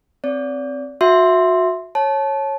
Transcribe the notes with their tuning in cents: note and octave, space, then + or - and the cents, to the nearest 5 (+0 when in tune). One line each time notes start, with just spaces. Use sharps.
C4 +0 D5 -35
F#4 -20 E5 +0 C6 +0
C#5 -15 A5 -20